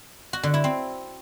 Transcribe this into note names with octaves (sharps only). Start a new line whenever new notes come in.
F#4
D3
E4
C4